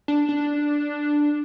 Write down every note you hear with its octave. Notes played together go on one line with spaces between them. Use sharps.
D4
D4